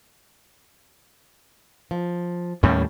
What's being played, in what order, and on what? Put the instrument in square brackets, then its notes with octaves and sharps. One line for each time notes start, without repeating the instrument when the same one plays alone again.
[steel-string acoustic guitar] F3
[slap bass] D#2 A2 G3 [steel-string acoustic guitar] C#4